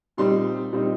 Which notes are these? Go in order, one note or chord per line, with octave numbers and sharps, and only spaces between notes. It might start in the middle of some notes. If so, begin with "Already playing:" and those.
A#2 G3 C4 D#4 C6
A#2 G3 C4 D#4